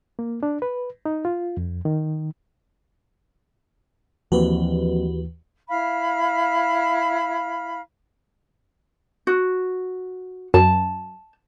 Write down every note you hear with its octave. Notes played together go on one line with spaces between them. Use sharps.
A#3
D4
B4
D#4
F4
F2
D#3
D#2 E3 F3 A#3 C4 F#4 G4 B4
E4 F5 B5
F#4
F#2 A5